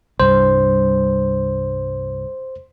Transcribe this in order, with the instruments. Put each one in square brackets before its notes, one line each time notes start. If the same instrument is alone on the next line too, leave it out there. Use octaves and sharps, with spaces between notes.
[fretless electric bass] C2 G2 [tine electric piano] C5